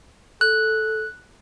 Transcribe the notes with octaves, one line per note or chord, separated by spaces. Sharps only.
A4 F#6